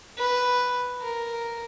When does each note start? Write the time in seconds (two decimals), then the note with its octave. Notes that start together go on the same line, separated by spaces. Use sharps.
0.18 B4
1.01 A#4